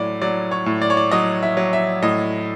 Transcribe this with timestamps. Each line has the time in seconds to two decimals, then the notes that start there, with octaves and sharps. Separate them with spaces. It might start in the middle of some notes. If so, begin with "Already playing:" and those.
Already playing: A2 F#3 D5
0.22 F#3 D5
0.51 C#5
0.66 A2
0.82 D5
0.90 C#5
0.97 D5
1.11 F#3 D#5
1.43 E5
1.57 F#3
1.73 E5
2.02 A2 D#5